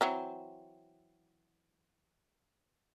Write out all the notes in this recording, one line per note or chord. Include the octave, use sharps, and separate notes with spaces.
E3 F#3 C4